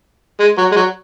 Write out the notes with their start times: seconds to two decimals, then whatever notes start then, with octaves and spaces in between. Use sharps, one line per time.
0.40 G#3
0.58 F#3
0.72 G#3
0.76 F#3